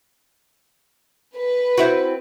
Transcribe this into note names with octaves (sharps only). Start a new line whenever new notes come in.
B4
C4 E4 F#4